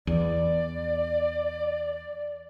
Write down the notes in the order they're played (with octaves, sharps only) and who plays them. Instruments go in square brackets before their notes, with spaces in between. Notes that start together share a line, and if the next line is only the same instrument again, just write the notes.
[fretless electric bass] E2 [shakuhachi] D5